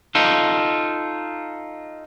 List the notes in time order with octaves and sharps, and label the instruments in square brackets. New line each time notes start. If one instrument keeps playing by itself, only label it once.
[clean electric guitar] D#4 F4 A4